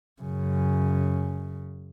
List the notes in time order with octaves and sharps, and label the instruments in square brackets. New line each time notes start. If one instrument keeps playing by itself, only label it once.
[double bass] F#2 C#3